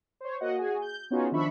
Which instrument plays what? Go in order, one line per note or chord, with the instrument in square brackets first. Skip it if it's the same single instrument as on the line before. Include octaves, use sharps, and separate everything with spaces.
[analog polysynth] C5 C#5
A#3 F#4 D#5 F#5
F#4 G#4 G#5
G6
B3 C#4 D#4 F4 F#4 G#4
D#3 F3 D4 E5 B5 C#6